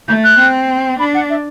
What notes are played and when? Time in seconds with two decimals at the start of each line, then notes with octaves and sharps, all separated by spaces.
0.08 A3 G6
0.24 F#6
0.39 C4
0.99 D4 B5
1.14 F#5
1.30 E5